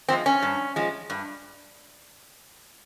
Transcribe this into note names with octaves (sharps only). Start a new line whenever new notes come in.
F3 G#3 C4
C#4
G2
F3 G#3
G2